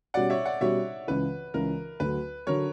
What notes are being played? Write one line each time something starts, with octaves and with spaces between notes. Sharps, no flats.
B2 G3 C#4 F#4 D5 F#5
C#5 E5
D5 F#5
B2 G3 C#4 F#4 C#5 E5
C#2 C#3 E3 B4
C#2 C#3 E3 A#4
D2 D3 F#3 B4
D3 F#3 A#4 C#5